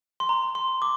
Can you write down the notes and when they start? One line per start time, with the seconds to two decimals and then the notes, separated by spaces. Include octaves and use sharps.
0.20 C6
0.29 A#5
0.55 C6
0.82 D6